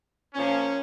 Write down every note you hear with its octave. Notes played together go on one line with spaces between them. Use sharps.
A#2 F3 A#3 C#4